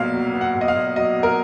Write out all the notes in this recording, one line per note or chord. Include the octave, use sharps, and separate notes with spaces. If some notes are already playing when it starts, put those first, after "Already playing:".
Already playing: B1 A#2 F#3 B3 F5
F#3
B3
F#5
B1
D#5
F5
A#2
F#3 D#5
B3
A#4